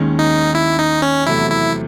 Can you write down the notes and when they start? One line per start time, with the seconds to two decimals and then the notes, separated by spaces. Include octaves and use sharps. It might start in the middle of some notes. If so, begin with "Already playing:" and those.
Already playing: D#2 D#3 G#3 C#4
0.19 D#4
0.55 E4
0.79 D#4
1.02 C#4
1.26 E2 C3 F#3 A3 E4
1.50 E4